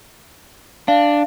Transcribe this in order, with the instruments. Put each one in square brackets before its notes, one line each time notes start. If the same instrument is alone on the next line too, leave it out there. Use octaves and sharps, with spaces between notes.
[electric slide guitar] D4 [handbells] F5